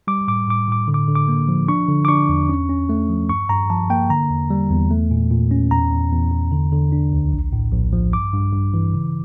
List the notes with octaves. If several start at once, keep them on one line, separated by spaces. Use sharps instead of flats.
G3 D6
A2 D6
A2 D6
A2 D6
D3
D6
D3
D6
A#3
F3
D4 C#6
D3
D6
D4 C#6
E2
C#4
C#4
A3
F3
G2 C#6
G2 A#5
F3 A5
A#3 G5
D3 A#5
E2
G3
E2
A3
A#2
A#2
C#4
E2 A#5
E2
E2
E2
D3
D3
D4
D2
A#1
A2
A#1
F3
G2 D6
G2
G2
E3
C#3